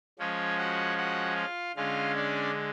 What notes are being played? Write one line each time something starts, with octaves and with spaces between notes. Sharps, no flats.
F3 G#3 C#4 C#5
F#4 F#5
F#4 F#5
F4 F5
D3 G#3 C#4 F4 F5
D4 D5